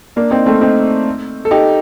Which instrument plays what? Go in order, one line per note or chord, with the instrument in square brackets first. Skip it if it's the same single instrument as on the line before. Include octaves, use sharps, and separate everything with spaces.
[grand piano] A#3 D4
C4 D#4
A3 C4
C4 D#4
A4
D#4 G4